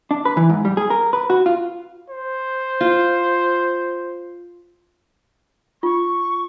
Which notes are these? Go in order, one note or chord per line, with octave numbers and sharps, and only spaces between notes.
D4
B4
E3
G#2
G3
G#4
A#4
B4
F#4
F4
C5
F4
F4 C#6